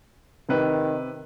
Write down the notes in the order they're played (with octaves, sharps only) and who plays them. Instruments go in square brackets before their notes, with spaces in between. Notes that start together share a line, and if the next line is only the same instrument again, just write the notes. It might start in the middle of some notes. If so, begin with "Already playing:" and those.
[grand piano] C3 B4 [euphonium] D#3